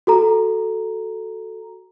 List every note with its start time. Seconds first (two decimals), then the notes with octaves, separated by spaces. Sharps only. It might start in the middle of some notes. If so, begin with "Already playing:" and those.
0.07 F#4 A4 A#5